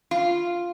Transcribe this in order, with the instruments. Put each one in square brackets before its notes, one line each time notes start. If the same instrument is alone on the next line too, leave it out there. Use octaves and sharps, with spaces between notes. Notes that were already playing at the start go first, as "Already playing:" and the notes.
[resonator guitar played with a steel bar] F4